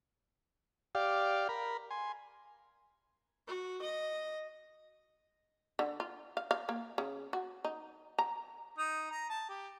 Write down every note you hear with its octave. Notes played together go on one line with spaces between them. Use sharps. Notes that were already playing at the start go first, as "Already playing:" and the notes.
G4 D5 F5
A#4 B5
G#5 C6
F#4
D#5
D3
F4
F5
F5
A#3
C#3
F#4
D#4
A#5
D#4
A#5
A5
G4